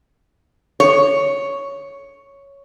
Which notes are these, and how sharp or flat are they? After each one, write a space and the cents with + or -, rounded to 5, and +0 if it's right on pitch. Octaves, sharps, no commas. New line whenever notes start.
C#5 +5